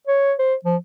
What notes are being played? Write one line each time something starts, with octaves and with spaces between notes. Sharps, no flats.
C#5
C5
F3